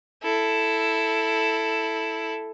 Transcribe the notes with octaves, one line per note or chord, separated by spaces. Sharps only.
E4 A4